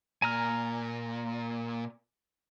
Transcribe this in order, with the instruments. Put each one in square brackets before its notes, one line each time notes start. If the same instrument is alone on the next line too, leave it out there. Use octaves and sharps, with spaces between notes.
[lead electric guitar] A#2 [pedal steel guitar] G#5 A#5 F6